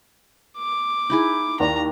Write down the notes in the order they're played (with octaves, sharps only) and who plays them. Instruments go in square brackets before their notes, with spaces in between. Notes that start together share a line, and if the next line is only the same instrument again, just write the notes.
[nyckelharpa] D6
[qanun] D#4 E4 G#4
[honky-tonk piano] D#2 D5 [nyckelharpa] A#5